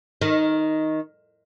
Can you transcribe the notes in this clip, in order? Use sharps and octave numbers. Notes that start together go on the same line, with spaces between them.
D#3